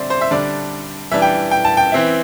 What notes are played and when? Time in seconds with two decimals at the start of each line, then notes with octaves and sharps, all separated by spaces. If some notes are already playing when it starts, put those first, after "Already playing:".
Already playing: D3 G3 C4 E4 C5 D5 E5
0.10 C5
0.21 E5
0.31 D3 G3 D4 D5
1.11 E3 G3 D4 E5
1.22 G5
1.51 G5
1.65 A5
1.77 G5
1.92 E3 C4 E4